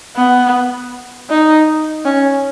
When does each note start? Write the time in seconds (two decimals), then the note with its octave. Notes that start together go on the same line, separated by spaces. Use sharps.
0.16 B3
1.30 D#4
2.05 C#4